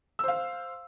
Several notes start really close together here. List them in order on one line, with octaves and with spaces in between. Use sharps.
E6 C5 F5